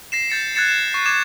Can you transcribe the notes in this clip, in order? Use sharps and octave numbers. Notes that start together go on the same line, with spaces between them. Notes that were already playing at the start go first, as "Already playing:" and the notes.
A#6 C7 E7
G6 A6 C#7
F#6 G#6 A6 C#7 E7
E7
C#6 C7
D6 G#6 E7